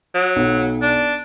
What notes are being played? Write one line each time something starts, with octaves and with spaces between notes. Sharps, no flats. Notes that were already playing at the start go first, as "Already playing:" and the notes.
F#3
B1
D4